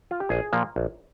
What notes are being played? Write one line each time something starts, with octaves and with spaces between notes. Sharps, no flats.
F4
G4
A#1 G#4
A#2 F3 A#3
A#1